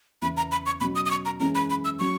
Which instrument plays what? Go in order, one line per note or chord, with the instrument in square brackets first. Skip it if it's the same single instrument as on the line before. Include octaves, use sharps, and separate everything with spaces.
[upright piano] E2 C#3 E3 B3 E4 [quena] B5
[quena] A#5
B5
C#6
[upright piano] B2 F#3 C#4 [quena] B5
[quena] D#6
D#6
C#6
A#5
[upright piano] F#2 E3 G#3 C#4 [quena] A#5
[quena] B5
B5
E6
[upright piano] F#3 C#4 [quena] C#6